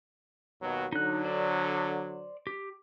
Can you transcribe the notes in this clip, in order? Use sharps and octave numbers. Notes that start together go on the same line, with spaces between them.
D#2 B2 F#3
D3 F#3 D#4 F#6
C5 D5
G4